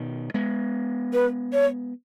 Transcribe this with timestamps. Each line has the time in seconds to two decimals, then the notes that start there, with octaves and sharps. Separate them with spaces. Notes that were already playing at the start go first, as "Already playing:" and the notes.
Already playing: B2 D#3
0.34 G#3 B3
1.13 B4
1.53 C#5